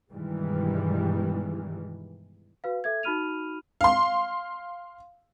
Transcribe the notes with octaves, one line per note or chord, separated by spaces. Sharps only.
G2 B2 D#3 E3 G3 G#3
F#4 B4 F5
A4 E5 G#6
D#4 F#4 B5 F6 D#7 F7
F5 C6